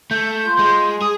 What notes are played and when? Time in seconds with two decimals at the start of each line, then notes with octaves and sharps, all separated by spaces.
0.11 A3 G6
0.46 F4
0.59 G#3
1.02 G#4 D#6